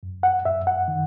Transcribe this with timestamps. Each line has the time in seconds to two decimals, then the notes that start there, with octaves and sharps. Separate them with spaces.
0.03 F#2
0.23 F#5
0.45 F#2 E5
0.67 F#5
0.88 D#3